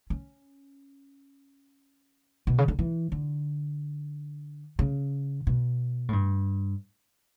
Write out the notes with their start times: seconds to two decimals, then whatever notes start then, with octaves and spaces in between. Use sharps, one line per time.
0.10 C#4
2.47 B2
2.58 C#3
2.68 D3
2.79 E3
3.12 D3
4.79 C#3
5.47 B2
6.09 A2
6.13 G2